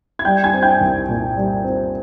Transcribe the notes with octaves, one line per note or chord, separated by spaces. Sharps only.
G#6
G3 G5 G6
G#5 G#6
C4
G5 G6
C2
A#2
G3
C4